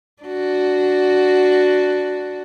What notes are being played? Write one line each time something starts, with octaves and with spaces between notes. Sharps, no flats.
D4 F#4